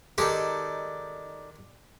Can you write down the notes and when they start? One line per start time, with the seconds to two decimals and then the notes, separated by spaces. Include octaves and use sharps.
0.18 D#3 G#3 D#4 G4 A4 D5